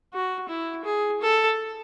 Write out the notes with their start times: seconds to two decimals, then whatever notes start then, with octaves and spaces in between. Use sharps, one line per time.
0.13 F#4
0.48 E4
0.85 G#4
1.21 A4